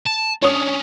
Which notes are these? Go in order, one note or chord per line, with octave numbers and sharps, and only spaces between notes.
A5
C#4 D4 C#5 D#6